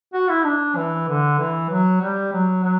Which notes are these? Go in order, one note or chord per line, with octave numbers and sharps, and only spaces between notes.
F#4
E4
D4
E3
D3
E3
F#3
G3
F#3
F#3